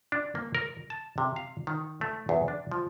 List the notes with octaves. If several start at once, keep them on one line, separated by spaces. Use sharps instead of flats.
D4
A#3
A#4
A5
C3
F5
D#3
A3
E2
D4
F3